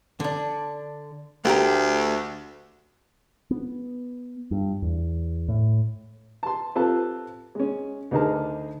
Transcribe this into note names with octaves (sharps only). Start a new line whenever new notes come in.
D3 D4
D2 A3 G4 A#4
B3
G2
E2
A2
A5 C6
C4 F4 G4 A4 B4 A5
G#3 C#4
D2 D3 D#4 G#4 A#4 A5